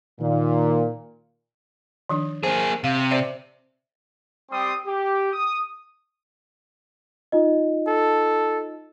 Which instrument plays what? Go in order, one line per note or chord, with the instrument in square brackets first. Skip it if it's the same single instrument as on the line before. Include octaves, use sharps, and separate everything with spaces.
[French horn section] A#2 [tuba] D#3
[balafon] D#3 F3 D4
[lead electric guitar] A#3 G#4 [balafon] C5
[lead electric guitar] C3 [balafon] F5
[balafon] C5 D5 E5
[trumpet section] G3 C4 G4 C6 D#6
G4
D#6
[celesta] D#4 F4 D#5
[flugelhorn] A4